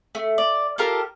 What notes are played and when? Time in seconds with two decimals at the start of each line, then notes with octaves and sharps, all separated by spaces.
0.15 A3
0.38 D5
0.78 F4 G4 A4 A#4